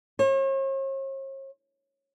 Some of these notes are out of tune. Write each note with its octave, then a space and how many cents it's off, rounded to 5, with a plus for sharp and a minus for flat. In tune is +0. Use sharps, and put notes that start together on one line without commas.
C#5 -45